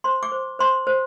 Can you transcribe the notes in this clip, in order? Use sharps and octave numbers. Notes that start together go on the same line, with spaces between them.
C5 C6
D6
C5
C5 C6
C5